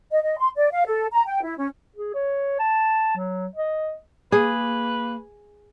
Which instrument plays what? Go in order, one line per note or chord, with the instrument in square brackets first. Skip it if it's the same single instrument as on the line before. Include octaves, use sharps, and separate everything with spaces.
[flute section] D#5
D#5
C6
D5
F5
A4
A#5
G5
E4
C#4
[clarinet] G#4
C#5
A5
F#3
D#5
[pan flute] A#3 [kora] G#4 [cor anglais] B4